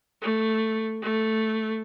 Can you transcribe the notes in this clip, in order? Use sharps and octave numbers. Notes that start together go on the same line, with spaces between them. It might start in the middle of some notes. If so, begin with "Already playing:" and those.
A3
A3